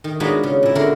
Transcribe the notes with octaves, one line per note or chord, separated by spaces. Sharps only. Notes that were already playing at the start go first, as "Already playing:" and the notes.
D#3
G#3 B3 D4 D#4 F4 F#4
C#3
A#2 E4
D3 F#4 A#4